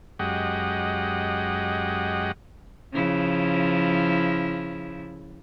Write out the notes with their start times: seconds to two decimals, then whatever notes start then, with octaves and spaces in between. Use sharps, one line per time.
0.19 F#2 G#3 G4 D#5 F#5
2.93 C#3 F3 E4